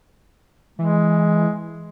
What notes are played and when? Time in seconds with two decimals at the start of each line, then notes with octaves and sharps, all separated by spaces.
0.79 E3 G#3